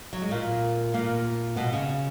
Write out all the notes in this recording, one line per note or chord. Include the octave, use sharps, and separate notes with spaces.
F#3
G#3
A#2 A#3
A#2 A#3
B2 B3
C#3 C#4